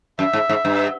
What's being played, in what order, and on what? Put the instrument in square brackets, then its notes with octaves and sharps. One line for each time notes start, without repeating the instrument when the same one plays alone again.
[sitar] F#2 [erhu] E5
[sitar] G#2
G#2
G2